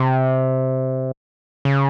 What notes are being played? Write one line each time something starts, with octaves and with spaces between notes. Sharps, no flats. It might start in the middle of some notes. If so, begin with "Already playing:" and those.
Already playing: C3
C#3